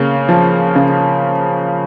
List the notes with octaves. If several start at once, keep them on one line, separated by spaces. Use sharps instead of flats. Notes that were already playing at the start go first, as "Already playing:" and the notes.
Already playing: C#3 A#3
F3
C#3